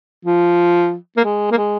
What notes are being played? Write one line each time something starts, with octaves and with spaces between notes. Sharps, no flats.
F3
A#3
G#3
A#3
G#3